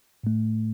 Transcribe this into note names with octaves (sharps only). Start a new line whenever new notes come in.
A2 A3